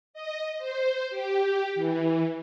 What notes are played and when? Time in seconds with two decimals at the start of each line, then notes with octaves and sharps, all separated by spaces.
0.14 D#5
0.58 C5
1.10 G4
1.75 E3